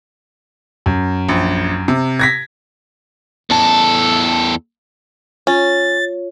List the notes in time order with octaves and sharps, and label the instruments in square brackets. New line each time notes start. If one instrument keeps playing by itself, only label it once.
[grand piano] F#2
[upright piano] A#1
C3
[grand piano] G#6 A#6 B6
[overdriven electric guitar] E2 A4
[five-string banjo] C#4 [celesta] F4 C#5 [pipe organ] A6